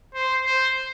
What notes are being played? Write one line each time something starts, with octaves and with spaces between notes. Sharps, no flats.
C5
C5